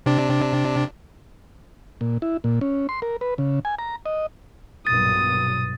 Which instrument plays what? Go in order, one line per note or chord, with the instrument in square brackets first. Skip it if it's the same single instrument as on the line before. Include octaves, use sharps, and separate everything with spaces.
[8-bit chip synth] C3 D4
[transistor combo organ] A#2
E4
A#2
C#4
C6
A#4
B4
C#3
G#5
A#5
D#5
[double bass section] B1 G2 A#2 [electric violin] D#6 [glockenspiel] A6